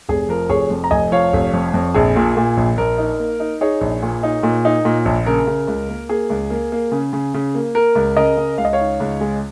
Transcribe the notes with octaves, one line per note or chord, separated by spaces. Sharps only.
F1 G#4
F3 A#4
F1 G#4 C#5
F2
A#5
F1 D#5 G#5
F3 C#5 F5
F1
F2
F2
A#1 G#4
A#2
A#2
A#1
A#1 A#4
D#4
A#3
D#4
D#4 G#4 C#5
A#1
A#2
D#4
A#2
D#4
A#2
A#1
C#3 A#4
C#3
C#2
A#3
A#3 G#4
C#2
A#3
A#3
C#3
C#3
C#3
A#3
A#3 A#4
C#2
C#3 A#4 D#5
C#3
C#2 F5
D#5
C#5 F5
D#4
C#2
G#3